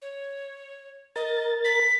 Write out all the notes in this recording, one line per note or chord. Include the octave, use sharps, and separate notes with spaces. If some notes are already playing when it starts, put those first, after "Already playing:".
C#5
A#4 D#5 A6
B6